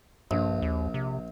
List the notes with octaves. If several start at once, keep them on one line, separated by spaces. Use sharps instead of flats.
A#1 G2
D#2
C3